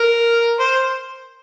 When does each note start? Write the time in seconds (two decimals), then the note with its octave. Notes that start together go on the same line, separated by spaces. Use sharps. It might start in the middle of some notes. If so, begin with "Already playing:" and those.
Already playing: A#4
0.59 C5